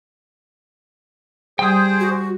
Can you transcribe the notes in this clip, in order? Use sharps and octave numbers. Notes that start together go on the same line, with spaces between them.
G3 G#4 C5 G5 D#6
F#4